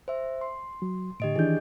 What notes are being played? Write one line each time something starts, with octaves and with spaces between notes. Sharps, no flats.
C5 E5
C6
F#3
A2 D3 G4 D#5 D7
D#3 E3 D4 G#4 G6